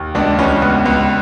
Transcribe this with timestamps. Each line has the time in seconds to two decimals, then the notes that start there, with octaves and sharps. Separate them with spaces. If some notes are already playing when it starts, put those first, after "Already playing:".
Already playing: D#2
0.15 C#2 D4
0.39 C#2 C#4
0.62 C#2 B3
0.86 C#2